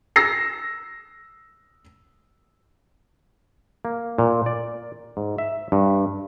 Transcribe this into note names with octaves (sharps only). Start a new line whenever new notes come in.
E6 A#6 C7
A#3
A#2
D5
G#2
E5
G2